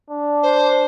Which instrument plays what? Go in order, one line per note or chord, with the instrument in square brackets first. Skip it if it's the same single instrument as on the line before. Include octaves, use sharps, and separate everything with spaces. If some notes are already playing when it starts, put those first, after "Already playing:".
[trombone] D4
[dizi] C5